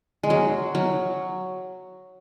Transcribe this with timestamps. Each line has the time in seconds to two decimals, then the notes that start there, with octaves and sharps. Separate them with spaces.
0.23 G#3
0.30 F#3
0.75 F#3